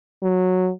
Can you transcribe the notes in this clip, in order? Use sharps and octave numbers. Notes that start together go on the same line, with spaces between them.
F#3